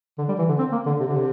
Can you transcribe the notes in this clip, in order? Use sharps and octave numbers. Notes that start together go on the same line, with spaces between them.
D3
G3
E3
D3
C4
A#3
D3
C3
D3
C3